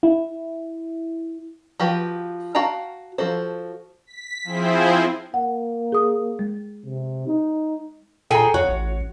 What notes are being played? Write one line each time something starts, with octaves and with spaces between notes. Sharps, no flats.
E4
F3 F#4 G4 B4
F#4 F5 G5 A5 A#5
F3 F#4 A4 C5
B6
F3 C4 E4 G#4 C5
A#3 F#5
G#4 D#6
G#3
C3
D#4
A#2 G#4 A4 G5 G#5 A#5
F2 F#4 C#5
A1